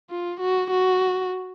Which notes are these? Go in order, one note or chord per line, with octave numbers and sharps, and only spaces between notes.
F4
F#4
F#4